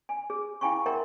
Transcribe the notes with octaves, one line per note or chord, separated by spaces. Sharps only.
G#5
G#4
E4 F5 G5 G#5 B5 C#6
A#4 E5 F#5 G5 A#5 C6